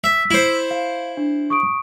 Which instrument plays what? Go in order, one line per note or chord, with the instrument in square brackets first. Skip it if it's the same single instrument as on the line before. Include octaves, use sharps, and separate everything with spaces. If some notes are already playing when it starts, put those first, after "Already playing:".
[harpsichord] E5 [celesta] E6 B6
[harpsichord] E4 C5
[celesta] F5
D4
C#6 D#6 D7